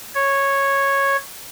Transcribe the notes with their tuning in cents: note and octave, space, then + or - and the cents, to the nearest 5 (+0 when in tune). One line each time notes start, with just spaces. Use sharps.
C#5 -10